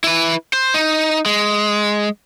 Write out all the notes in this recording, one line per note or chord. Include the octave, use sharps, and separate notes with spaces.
E4 B4
C5
D#4
G#3